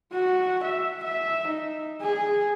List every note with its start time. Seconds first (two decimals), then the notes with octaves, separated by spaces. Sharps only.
0.12 F#4
0.63 E5
1.04 E5
1.47 D#4
2.02 G#4